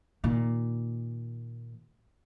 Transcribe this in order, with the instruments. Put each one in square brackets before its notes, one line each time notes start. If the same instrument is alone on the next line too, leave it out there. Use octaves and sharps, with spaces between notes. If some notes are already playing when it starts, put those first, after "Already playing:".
[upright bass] A#2 D#3